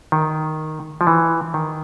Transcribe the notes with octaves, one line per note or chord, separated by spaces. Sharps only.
D#3
F3
E3
D#3